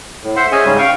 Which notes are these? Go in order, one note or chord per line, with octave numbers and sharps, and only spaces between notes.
A2
C5 E5 F#5 C6
C#4 G#4 D#5 E5 G#5
G#2 C#3 G3 C#4
F5 G5 C#6